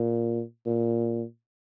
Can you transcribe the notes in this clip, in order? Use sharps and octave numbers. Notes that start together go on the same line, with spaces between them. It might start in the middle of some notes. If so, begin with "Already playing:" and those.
Already playing: A#2
A#2